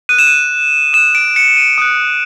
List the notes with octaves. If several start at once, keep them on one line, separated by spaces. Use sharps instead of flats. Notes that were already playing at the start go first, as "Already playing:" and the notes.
D#6 F#6 D#7
E7
D#7
D#6 F#6 E7
D7
C#7
D#7
D#6 F#6